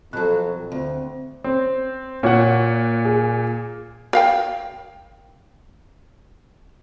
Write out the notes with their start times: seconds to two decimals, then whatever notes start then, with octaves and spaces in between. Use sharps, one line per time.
0.13 F2 B2 F#3 A4 A5 F#6
0.72 D2 C4
1.44 C4
2.23 A#2 C#5 F#5
3.05 G#4
4.13 A#4 F5 G5